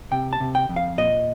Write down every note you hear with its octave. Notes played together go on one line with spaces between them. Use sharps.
C3 G5
A5
C3
G5
F2
F5
A#2 D#5